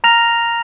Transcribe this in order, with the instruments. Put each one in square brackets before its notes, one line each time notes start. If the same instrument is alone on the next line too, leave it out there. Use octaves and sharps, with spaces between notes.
[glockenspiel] A#5 F6 A#6 F7